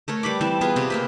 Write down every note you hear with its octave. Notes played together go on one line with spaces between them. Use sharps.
A3 A#4 C#5
G3 B4 B5 D6
E3 C4 A5
B3 F4 G#4 B4
C3
A#3 C4 B4